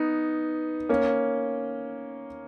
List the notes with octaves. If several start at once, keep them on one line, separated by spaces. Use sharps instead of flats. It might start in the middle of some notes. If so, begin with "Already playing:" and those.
Already playing: B3 D#4
A#3 C#4